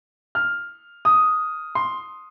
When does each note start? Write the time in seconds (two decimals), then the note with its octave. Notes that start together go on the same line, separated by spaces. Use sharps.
0.35 F6
1.05 D#6
1.75 C6